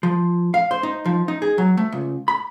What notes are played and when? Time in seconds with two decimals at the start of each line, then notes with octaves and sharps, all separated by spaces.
0.03 F3
0.54 F5
0.71 C5
0.83 D#4
1.05 F3
1.28 D#4
1.42 G#4
1.58 F#3
1.77 A3
1.92 C#2
2.28 B5